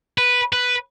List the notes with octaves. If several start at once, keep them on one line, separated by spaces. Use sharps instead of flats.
B4
B4